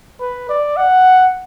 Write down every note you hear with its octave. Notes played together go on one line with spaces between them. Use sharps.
B4
D5
F#5